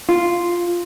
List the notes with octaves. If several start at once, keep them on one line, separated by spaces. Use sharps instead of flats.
F4